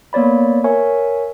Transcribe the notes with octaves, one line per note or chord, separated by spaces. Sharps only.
A#3 B3 C#5 D5 B5
A#4 C#5 E5 G#5 C#6